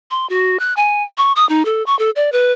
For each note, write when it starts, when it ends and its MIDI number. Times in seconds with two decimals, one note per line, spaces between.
0.11 0.28 84
0.30 0.60 66
0.60 0.74 90
0.77 1.03 80
1.17 1.32 85
1.36 1.47 87
1.49 1.65 63
1.65 1.85 69
1.86 1.97 85
1.99 2.10 69
2.16 2.32 74
2.32 2.52 71